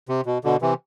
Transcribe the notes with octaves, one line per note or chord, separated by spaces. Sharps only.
C3
B2
B2 D3
C3 E3